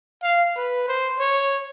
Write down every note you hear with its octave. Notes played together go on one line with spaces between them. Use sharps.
F5
B4
C5
C#5